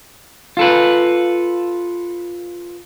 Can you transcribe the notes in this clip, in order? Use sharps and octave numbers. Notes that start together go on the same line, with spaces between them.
F4 A4 B4